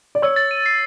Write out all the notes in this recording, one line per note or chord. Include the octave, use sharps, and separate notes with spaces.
D5
C#5 E6
A6
D#7
C7